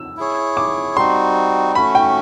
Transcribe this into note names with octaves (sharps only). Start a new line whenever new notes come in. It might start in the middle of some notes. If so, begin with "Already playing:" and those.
Already playing: E6
E4 G#4 C#5
D6
G3 C4 D#4 F#4 C6
A3 C#4 F#4 B5
G5